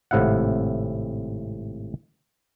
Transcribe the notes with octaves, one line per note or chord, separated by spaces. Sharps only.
G#1 A2 C3 E4 F5 F#5